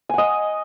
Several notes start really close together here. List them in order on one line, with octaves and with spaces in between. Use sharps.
G#5 F#5 D#5